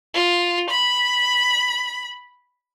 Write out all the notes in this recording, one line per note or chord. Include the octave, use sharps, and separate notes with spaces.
F4
B5